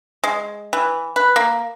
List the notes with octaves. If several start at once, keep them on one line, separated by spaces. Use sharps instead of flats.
G#3
E3
B4
A#3